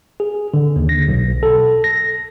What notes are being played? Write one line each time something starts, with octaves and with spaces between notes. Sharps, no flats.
G#4
D3
D#2
A#6
B1
A4
A#6